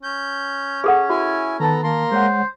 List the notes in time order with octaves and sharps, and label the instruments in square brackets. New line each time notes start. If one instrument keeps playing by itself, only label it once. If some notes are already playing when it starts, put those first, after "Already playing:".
[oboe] C#4 [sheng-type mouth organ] G6
[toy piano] G#4 A4 F#5
[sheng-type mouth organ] E4 G#5 [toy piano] F#4
[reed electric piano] D#3 A5 [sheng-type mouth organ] B3 A4 A#5
[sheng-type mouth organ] A#3 A#5 C6
[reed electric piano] G#3 C#5 F#5 [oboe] C5